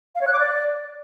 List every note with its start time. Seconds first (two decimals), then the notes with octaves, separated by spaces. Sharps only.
0.15 F5
0.21 C#5
0.27 F#6
0.33 D6
0.39 D5